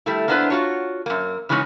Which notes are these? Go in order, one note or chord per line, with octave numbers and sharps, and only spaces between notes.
G3 A3 E4
A#3 B3 D4 E4 B4 C5
F4 F#4 C#5
F#2 A#3
C#3 E3 F#3 G#3 C#4 D#4